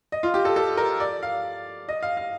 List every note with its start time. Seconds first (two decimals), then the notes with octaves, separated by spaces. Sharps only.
0.12 D#5
0.23 F4
0.34 G4
0.45 A4
0.56 A4
0.77 A#4
1.00 D5
1.23 F5
1.89 D#5
2.03 F5
2.17 F5